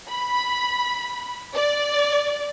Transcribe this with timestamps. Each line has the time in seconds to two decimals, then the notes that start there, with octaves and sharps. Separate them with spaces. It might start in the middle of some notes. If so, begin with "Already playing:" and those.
0.10 B5
1.55 D5